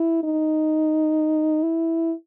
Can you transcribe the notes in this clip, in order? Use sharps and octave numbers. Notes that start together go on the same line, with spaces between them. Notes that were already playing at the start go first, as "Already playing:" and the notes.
Already playing: E4
D#4
E4